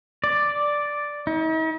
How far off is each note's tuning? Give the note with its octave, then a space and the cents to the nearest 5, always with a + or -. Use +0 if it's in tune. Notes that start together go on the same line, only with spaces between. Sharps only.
D5 +0
D#4 +45